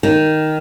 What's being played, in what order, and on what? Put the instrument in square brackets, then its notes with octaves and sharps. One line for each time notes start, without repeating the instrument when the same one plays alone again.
[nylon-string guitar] D#3